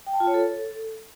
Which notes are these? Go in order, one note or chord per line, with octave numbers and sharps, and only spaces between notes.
G5
A5
F4
C#5
A4